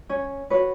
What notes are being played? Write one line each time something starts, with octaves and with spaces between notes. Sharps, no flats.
C#4 C#5
F#4 B4 C#5